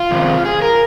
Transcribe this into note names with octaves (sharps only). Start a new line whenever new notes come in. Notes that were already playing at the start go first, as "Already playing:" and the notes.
Already playing: F4
F2 C3 D#3 G#3 C4
G#4
A#4